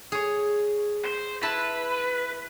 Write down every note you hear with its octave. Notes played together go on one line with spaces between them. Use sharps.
G#4 C#5
C5
E4 B4 A5 B5